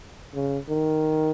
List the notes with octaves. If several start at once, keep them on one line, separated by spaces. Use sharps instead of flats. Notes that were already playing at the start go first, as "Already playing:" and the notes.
C#3
D#3